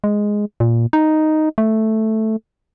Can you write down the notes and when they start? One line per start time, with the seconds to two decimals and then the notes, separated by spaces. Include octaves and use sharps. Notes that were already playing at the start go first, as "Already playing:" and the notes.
0.04 G#3
0.60 A#2
0.93 D#4
1.58 A3